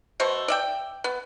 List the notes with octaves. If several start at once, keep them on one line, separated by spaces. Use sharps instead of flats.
B2 A3 C5
D5 E5 G5
B3